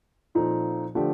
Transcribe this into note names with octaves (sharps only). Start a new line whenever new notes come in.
A#2 F3 C4 D#4 A4
D3 F3 A3 D4 G4